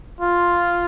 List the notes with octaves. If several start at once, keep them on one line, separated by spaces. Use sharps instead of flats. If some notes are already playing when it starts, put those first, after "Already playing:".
F4